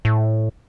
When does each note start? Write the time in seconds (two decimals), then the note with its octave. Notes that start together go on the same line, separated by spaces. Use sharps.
0.05 A2